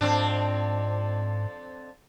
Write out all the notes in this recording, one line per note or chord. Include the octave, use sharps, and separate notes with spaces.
F2 G#2 C4 D4